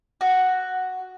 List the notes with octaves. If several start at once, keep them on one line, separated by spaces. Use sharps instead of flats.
F#4